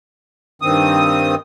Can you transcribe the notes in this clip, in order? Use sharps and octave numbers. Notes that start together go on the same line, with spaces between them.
G2 D#3 C4 D#6